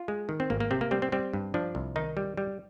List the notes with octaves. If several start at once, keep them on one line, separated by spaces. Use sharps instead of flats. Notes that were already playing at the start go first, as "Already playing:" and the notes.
Already playing: F4
G#3
D#3
C4
G#1 A#3
A#3
C3 C4
A#3
G3 C4
C4
G3 C4
G2
F3 D4
C2
D#3 D#4
G3
G3